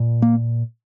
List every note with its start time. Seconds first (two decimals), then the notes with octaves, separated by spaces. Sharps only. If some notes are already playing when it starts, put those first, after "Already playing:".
Already playing: A#2
0.22 A#3